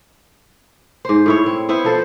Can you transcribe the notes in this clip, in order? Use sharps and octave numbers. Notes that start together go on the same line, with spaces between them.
G#2 C5
A2 E4 C#5
C4
B3 E4 C5
F3 A4 C5